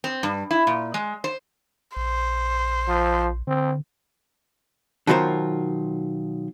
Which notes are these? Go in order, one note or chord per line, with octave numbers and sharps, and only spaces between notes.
C4
G2
E4
A#2
G#3
C5
A#1 C5
F3
D3 C4
B2 D#3 F#3 F4 A#4 C5